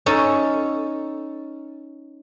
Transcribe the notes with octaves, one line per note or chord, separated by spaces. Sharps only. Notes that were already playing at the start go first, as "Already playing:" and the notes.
C#4 D#4 A4